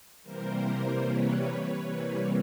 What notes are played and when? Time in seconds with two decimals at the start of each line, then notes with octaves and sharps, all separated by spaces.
0.23 C3 E3 G3 A#3 A#4 C5
1.02 B4 C#5
1.82 C3 E3 G3 A#3 B4 C#5